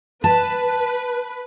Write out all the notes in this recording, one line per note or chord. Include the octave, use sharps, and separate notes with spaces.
B4 A5